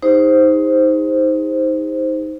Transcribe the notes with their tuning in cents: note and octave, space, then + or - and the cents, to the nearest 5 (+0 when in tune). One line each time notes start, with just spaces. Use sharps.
D#4 +20 G#4 -45 C5 +0